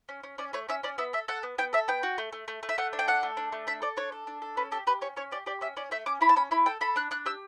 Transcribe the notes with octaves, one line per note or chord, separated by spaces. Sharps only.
C#4
C#4
C#4 D5
A3 C#5
C#4 E5
C#4 D5
B3 E5
A4 E5
A4 F#5
B3
B3 G5
A4 E5
B3 G5
F#4
A3
A3
A3
A3
E5
A3 F#5
D4
G5
A4 F#5
A3
D4
A3
D4 E5
A4 D5
D4 C#5
A4
D4
A4
C#4 B4
G4 A4
G4 B4
C#4 C#5
C#4 C#5
G4 D5
G4 D5
C#4 E5
C#4 D5
A3 E5
C#4 D6
E4 B5
A5
C#4 B5
E4 B5
A4 G5
A4 B5
D4 F#6
D4 F#6
G4 E6